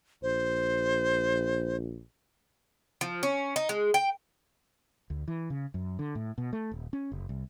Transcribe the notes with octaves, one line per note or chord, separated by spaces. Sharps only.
A#1 C5
F3
C#4
D#4
G#3
G5
D2
E3
C#3
F#2
D3
A2
B2
A3
D#1
C#4
F#1
C2